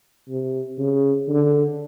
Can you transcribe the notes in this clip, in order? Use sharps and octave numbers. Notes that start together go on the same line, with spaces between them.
C3
C#3
D3